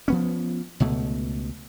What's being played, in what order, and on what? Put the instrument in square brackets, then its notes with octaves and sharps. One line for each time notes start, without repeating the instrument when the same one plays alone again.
[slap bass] F3 B3 C#4
C#2 B2 A3